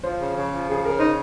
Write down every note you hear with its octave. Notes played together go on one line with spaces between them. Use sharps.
F3 C5
C#3
C#3
F3
C#3 G#4
C#3 A#4
D#4 C5